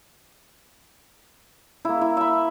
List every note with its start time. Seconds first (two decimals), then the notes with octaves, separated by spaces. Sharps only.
1.85 A#3 E4
2.01 E4
2.17 E5 B5